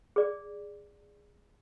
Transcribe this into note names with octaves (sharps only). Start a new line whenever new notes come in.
G#4 D5